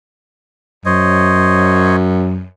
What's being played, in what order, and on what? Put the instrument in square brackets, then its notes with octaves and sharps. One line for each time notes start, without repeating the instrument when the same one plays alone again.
[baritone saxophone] F#2 [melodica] C5 C#5 D#5